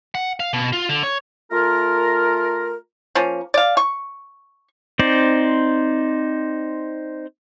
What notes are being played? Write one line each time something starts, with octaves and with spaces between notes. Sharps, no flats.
F#5
F5
B2
F4
D3
C#5
A3 F4 A#4
F3 A#3 C#4
D5 F5
C#6
C4 D#4 C5 D5